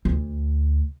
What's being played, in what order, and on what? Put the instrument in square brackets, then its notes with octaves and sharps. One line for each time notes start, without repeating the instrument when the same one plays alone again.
[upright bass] D2